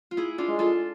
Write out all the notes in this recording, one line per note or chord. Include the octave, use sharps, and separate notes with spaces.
F4
E4 G#4
D4 F4
G#3
F4 A4